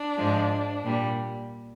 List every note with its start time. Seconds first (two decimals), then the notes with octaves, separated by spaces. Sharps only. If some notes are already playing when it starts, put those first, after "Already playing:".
Already playing: D4
0.16 G#2 F3 G#3
0.84 A#2 G3